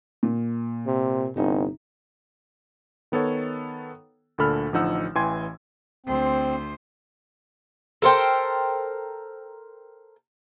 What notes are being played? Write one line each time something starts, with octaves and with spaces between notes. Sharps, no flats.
A#2
C3
G1 C3 D#4
D#3 B3 A4 C#5 F#5
D2 A#2 D3 A4 B5 F6
A1 D3 F3 D#4 F#5 E6
A1 E3 G5 G#5 C6 G#6
D2 C4 C5
A4 A#4 C5 G5